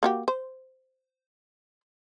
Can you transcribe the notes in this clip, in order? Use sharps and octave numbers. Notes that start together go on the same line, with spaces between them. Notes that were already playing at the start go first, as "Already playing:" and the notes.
A#3 F#4 G4
C5